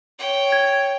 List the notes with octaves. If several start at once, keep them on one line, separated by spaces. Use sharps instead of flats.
C#5 G5
G#6